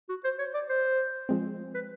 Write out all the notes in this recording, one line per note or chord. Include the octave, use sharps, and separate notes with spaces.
F#4
C5
C#5
D5
C5
F3 G#3 C4
B4